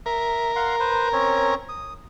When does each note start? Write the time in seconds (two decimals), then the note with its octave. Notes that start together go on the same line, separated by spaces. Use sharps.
0.06 A#4 E5
0.56 F5 F#5 C6
0.80 B4 C5
1.13 C4 C#4 C#5
1.69 D#6